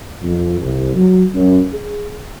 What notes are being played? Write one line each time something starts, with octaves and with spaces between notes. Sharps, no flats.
F2
C2
F#3
F#2
G#4